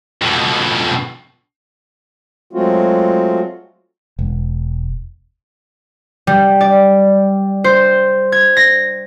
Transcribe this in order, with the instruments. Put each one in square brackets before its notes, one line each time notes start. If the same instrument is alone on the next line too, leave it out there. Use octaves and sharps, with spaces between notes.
[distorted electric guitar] F2 B2
[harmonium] F#3 G#3 A3 C4 F4 F#4
[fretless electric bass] E1
[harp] G3
D5
C5
G#6
A#6